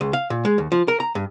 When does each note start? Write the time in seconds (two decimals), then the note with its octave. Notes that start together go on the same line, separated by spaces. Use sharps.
0.01 C#2
0.13 F5
0.30 A#2
0.45 G#3
0.58 D#2
0.72 F3
0.88 A#4
1.00 A#5
1.15 G2